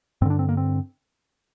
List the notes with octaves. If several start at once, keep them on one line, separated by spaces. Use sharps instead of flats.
G2 D3 C4 D4
C4
A#3
C4